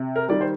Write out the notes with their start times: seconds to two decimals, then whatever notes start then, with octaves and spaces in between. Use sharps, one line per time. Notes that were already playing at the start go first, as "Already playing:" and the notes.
Already playing: C3
0.16 A#4
0.29 D#3 G3 D5
0.41 C5